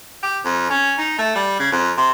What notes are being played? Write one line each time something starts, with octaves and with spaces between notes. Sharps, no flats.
G4
F2
C#4
D#4
A3
G3
C#3
F2
C3